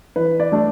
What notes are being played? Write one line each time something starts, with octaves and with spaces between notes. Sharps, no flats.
E3 B4
D5
A3 D4